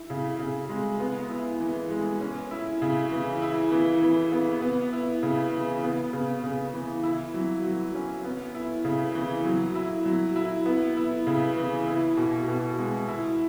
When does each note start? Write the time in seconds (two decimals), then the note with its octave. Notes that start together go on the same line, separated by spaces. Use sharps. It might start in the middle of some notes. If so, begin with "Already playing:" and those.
Already playing: E4
0.10 C#3
0.39 C#3
0.69 G#3
1.00 B3
1.30 E4
1.60 E3
1.90 G#3
2.21 C#4
2.51 E4
2.82 C#3
3.11 E3
3.42 E4
3.72 E3
4.02 E3
4.32 B3
4.62 B3
4.93 E4
5.23 C#3
5.53 E3
5.84 B3
6.13 C#3
6.43 C#3
6.74 E3
7.03 E4
7.34 F#3
7.64 F#3
7.95 C#4
8.24 B3
8.55 E4
8.84 C#3
9.15 E3
9.45 F#3
9.75 E4
10.06 F#3
10.36 E4
10.66 B3
10.97 E4
11.27 C#3
11.57 E3
11.87 E4
12.17 B2
12.48 B2
12.78 G#3
13.08 E4